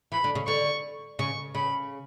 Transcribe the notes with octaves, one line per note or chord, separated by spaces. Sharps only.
E3 B5
D3
C#3
D3 C#6
C#3 C#6
C#3 B5